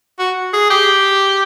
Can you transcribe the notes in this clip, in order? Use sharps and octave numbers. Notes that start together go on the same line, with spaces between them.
F#4
G#4
G4